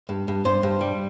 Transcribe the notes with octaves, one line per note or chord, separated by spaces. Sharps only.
G2
G2
G2 C5
G2
G3